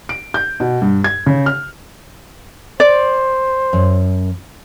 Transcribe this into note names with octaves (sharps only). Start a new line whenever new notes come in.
D7
G6
B2
G2
G#6
C#3
F6
C5 D5
F#2